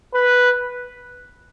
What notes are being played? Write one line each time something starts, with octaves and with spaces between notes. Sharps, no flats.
B4